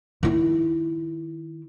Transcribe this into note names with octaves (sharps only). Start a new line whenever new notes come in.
D#3 E4